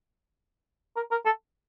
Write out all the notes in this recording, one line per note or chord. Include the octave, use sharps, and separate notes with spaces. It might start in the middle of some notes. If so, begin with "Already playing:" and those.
A#4
A#4
A4